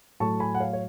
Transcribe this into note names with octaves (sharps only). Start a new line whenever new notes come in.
A2 F#3 A3 A5 C#6
G#5 B5
F#5
C#5 F5
C#5